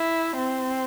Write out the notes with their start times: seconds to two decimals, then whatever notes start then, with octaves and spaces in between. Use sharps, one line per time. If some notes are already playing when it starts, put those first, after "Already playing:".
Already playing: E4
0.36 C4